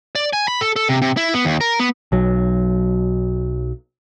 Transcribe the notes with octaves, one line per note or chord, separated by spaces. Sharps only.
D5
G#5
B5
A4
A4
C3
C3
E4
B3
D#2
A#4
B3
B1 F#3